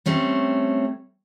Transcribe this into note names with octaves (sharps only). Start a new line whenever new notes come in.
G3 A3 C4 C#4